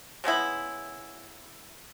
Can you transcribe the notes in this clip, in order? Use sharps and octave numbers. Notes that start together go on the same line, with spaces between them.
C#3 G#3 B3 E4